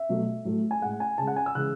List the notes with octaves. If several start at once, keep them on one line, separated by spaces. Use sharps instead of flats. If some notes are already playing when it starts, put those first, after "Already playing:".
Already playing: E5
B2 F#3 A3
A2 F#3 A3
G#5
A2 G#3 F#5
G#5
C#3 G#3 A5
F#5
G#5
E6
C#3 E3 G#3 F#6